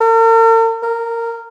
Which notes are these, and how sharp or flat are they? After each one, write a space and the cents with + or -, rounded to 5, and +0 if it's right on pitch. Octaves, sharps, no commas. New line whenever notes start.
A#4 -45
A#4 -10